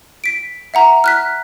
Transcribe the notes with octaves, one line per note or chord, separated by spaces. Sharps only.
B6 D7
E5 F#5 A#5
F6 F#6 B6